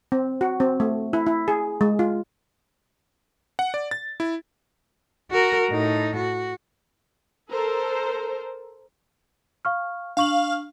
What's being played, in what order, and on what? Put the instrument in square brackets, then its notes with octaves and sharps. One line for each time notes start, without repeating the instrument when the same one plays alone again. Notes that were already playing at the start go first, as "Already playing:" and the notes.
[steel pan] C4
F#4
C4
A3
E4
E4
G#4
G#3
F4
[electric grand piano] F#5
D5
A6
E4
[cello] F#4 A#4
A2 D#4
F#4
[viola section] A4 A#4 C5
[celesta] F5 C#6 F6
[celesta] D4 C#6 F#7 [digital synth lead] F5